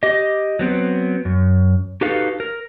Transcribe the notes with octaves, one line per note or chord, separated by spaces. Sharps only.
G4 D#5
F#3 B3 C4
F#2
D#4 F#4 G4 A4 B4 F5
A#4